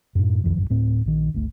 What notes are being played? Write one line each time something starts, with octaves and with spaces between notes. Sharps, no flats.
F#2 A2
B1 F2 D#3 F3
A1 F#2
D1 A2 C4
A#1 D#3
G1 C#2 A3